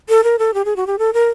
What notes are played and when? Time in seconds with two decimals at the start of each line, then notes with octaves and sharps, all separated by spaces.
0.09 A4
0.24 A#4
0.39 A4
0.54 G4
0.65 G#4
0.76 F#4
0.87 G4
0.99 A4
1.13 A#4